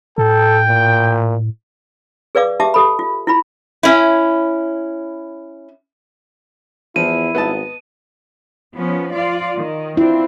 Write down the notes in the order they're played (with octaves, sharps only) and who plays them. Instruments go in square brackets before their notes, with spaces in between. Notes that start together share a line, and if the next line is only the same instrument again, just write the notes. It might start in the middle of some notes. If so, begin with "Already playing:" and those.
[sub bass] A2 [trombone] A4 [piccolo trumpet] G5
[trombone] A#2
[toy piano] G#4 B4 D5 F5 D6
G4 E5 A5 D6
G4 A4 B5
F4
E4 F4 B5
[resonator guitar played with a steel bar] C#4 E4
[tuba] E2 [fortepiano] F3 [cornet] E4 [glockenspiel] D#7
[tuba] G#1 [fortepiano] B3 D#5 A5
[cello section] F3 B3 C#4
F4 D5
D#3
[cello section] C4 D4 [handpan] E4 F4